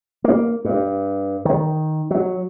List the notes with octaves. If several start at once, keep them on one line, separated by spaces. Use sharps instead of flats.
A#3
G2
D#3
F#3